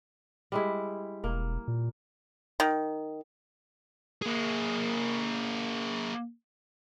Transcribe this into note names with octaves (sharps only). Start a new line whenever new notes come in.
G3 G#3 E4
E1 A#3
A#2
D#3
A#3 G#4